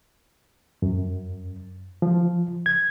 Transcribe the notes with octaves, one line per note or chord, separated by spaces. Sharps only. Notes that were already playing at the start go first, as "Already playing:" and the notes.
F#2
F3
G#6